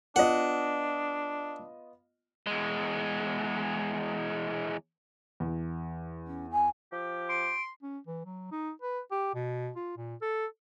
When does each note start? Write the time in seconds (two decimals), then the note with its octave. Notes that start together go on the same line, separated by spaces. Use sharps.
0.16 B3 D4 F4 D#5 F#5
2.47 E2 G#3
5.40 E2
6.27 C#4
6.51 G#5
6.92 F3 G4
7.29 C6 D7
7.83 C#4
8.07 E3
8.26 F#3
8.52 D#4
8.82 B4
9.11 G4
9.35 B2
9.76 F4
9.97 A#2
10.22 A4